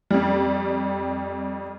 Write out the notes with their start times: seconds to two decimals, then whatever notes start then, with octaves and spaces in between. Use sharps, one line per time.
0.10 F2 G3